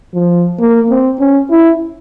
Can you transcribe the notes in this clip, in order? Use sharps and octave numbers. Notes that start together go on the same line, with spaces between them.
F3
A#3
C4
C#4
E4